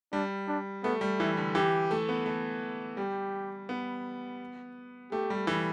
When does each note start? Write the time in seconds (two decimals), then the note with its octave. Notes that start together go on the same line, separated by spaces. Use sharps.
0.12 G3 D4
0.48 D4
0.83 A3 B3
1.01 G3
1.20 E3 E4
1.37 D3
1.55 E3 G4
1.91 A3
2.09 B3
2.26 A3
2.97 G3 G4
3.69 B3
5.12 A3 G4
5.30 G3
5.47 E3